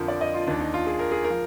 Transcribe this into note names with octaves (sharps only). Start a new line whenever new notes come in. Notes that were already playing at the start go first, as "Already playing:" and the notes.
Already playing: F2 D3 F3 A#4
D5
D#5
F4
D#2 D#3 D4
D#4
F4
G#4
A#4
G#4
A#4
F3